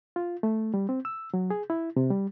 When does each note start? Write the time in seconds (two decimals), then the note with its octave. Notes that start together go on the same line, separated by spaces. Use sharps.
0.16 F4
0.43 A3
0.74 G3
0.89 C4
1.05 E6
1.34 F#3
1.50 G#4
1.70 E4
1.96 C3
2.10 G3